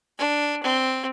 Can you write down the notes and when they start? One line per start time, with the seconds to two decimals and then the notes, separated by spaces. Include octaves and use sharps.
0.18 D4
0.63 C4